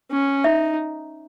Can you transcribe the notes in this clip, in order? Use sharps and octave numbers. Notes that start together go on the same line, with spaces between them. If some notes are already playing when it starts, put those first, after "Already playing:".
C#4
D#4 E5